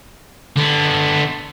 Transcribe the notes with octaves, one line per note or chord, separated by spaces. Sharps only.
D3 B3